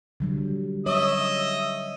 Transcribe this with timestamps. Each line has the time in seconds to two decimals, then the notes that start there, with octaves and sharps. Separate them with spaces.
0.20 D3 F#3 G3
0.86 C#5 D#5 E5 D#6